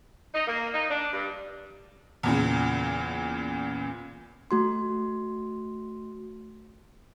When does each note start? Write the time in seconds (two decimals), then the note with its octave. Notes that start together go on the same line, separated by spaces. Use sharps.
0.34 D#4
0.47 A#3
0.73 D#4
0.90 D4
1.13 G2
2.23 E2 A#2 C#3
4.51 A3 F#4 C6